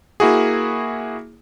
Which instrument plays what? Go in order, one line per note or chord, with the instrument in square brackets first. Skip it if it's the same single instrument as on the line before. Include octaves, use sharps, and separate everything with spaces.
[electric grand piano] A#3 E4 F#4 G#4